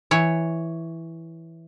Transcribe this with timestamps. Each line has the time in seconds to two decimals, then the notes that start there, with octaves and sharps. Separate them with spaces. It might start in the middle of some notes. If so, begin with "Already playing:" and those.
0.11 E3 C#5